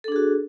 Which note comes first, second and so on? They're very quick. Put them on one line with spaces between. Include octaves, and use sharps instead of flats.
A4 D4 G#4 F#4